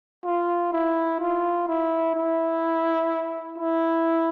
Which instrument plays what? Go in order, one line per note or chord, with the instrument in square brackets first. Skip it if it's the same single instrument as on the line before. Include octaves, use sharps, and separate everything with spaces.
[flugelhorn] F4
E4
F4
E4
E4
E4